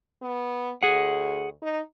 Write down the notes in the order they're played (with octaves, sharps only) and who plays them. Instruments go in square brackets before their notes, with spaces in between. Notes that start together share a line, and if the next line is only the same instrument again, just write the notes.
[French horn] B3
[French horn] D2 [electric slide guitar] G#4 F#5
[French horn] D#4